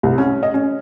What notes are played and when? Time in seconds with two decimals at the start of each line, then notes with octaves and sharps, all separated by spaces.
0.03 C2
0.18 C#4
0.43 D#5
0.54 C#4